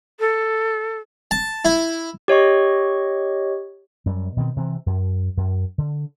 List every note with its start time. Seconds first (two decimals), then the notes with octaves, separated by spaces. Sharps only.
0.20 A4
1.31 A5
1.65 E4
2.28 G4 C#5 D#5 C#6
4.06 F#2 G3
4.37 B2 D#3 A#3 C4
4.56 C3 E3 C4
4.86 F#2
5.37 F#2
5.78 D3